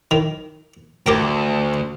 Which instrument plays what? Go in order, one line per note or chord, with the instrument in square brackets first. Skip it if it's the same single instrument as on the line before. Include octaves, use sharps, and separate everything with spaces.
[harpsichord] D#3
[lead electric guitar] D2 [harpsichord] G4 A#4 G5